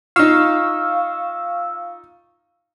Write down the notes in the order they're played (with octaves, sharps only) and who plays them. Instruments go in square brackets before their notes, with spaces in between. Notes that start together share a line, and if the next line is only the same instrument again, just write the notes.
[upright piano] D#4 F4 [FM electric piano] F5 C#6 E6